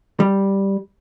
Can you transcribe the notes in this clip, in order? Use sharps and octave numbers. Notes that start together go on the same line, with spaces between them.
G3